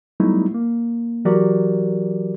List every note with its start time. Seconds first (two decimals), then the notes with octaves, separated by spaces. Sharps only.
0.20 F#3 G3 A3 B3 D#4 E4
0.54 A#3
1.25 E3 F#3 F#4 G4 A#4 D5